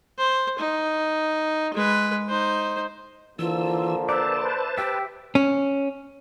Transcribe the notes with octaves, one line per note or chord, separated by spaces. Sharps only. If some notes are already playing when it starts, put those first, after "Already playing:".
C5
D#4
G#3 B4
D#4 C5
D3 E3 F3 A#3 F4 E6
B4 C5 D5 E5 A5 A#5
G4 E5 G5
C#4